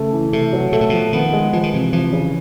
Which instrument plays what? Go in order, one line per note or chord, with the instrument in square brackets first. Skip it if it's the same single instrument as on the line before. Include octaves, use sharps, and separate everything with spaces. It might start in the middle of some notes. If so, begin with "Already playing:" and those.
Already playing: [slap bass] C#3 [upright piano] A3
[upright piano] E3
[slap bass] C3 [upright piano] A3
[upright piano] F#3
[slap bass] B2 [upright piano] A3
[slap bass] A#2
[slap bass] B2 [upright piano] F3
[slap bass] D#3 [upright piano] B3
[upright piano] G#3
[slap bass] E3 [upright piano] F3
[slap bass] D#3
[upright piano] C3 [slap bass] E3
[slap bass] E3 [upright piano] F3
[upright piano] C#3